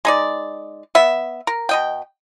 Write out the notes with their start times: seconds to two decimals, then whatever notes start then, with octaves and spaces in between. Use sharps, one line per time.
0.05 G#3 D#4 D5
0.95 B3 E5
1.47 A#4
1.69 B2 D#5 G5